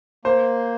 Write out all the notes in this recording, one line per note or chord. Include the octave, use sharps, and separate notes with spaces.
A#3 C5